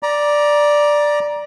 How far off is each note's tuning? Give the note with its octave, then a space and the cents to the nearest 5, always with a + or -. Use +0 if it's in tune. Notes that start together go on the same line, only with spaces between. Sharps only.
D5 +0 A#5 +25